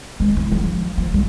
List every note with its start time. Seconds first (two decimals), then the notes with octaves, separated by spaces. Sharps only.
0.20 G#3
0.37 E3
0.52 F3
0.98 F3
1.14 G3